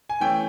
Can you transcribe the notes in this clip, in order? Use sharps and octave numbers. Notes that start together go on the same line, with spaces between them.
G#5
E3 A3 C#4 G5